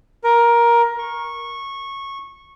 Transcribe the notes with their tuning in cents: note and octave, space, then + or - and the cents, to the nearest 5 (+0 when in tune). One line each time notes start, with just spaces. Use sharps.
A#4 +15
C#6 -15